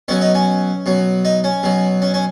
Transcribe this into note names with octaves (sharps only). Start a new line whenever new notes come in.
B2 F#3 C#4
D#4
C#4
B2 F#3
D#4
C#4
B2 F#3
C#4
C#4